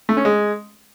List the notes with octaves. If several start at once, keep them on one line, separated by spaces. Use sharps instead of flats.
A3
C#4
G#3